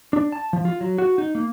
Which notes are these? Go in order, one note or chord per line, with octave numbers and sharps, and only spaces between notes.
D4
A5
F3
F4
F#3
F#4
D#4
A#3